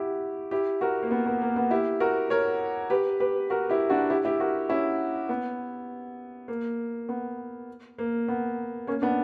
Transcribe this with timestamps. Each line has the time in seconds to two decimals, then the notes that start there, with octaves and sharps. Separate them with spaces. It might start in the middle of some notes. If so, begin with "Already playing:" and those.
Already playing: E4 F#4 G4
0.51 E4 G4
0.81 F#4 A#4
1.03 A#3
1.11 B3
1.26 B3
1.41 A#3
1.56 B3
1.71 E4 G4
2.00 F#4 A#4
2.30 A#4 C#5
2.90 G4 B4
3.20 G4 B4
3.50 F#4 A#4
3.70 E4 G4
3.90 D4 F#4
4.10 E4 G4
4.25 E4 G4
4.40 F#4 A#4
4.69 C#4 E4
5.29 B3
6.48 A#3
7.09 B3
7.99 A#3
8.28 B3
8.87 A#3 C#4
9.02 B3 D4